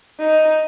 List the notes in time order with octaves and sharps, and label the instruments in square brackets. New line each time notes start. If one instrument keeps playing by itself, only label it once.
[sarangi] D#4